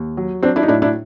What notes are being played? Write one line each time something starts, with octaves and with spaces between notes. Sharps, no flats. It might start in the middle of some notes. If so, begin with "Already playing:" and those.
Already playing: D#2
F#3
F#3 C4 D4
D4 E4
D#4
A2 D4 E4
D4 E4